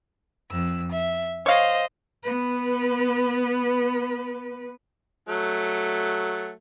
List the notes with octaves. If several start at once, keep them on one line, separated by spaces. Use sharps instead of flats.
F2 E6
E5
C5 C#5 D#5 F5
B3 B4
F#3 A3